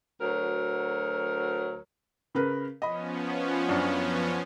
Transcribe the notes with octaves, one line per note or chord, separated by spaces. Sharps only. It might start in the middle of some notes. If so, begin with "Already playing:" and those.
D2 F#3 A#4
C#3 A#4 B4
F3 B3 C#4 D#5 B5
F#2 D4